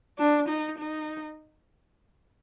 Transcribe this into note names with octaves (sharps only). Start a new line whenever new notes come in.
D4
D#4
D#4